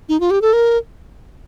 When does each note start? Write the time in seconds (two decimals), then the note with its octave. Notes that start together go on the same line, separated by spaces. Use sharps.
0.09 D#4
0.20 F4
0.31 G4
0.42 A4
0.53 A#4